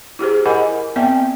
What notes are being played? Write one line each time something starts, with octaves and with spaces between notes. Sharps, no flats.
E4 G4 G#4 C5
E4 A#4 D#5 F#5 G#5 B5
B3 C4 D5 E5 G5 G#5